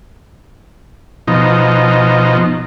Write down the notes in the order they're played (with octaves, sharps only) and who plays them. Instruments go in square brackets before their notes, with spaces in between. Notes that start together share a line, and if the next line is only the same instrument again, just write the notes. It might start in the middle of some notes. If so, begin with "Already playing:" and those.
[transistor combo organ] B2 F3 D#4